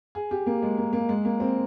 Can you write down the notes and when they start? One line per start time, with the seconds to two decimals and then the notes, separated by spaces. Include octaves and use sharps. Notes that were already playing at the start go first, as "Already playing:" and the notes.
0.15 G#4
0.31 G4
0.46 A#3
0.63 G#3
0.77 A#3
0.93 A#3
1.09 G#3
1.25 A#3
1.40 C4